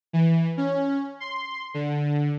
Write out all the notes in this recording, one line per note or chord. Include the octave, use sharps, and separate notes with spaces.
E3
C#4
C6
D3